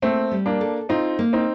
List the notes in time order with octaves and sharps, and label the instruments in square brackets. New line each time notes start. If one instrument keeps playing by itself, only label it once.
[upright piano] A3 C4 [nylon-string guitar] A#3
[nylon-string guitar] G3
[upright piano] A#3 D4
[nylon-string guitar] A4
[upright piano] C4 D#4 [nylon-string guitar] F4
[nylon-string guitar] A#3
[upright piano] C4 D#4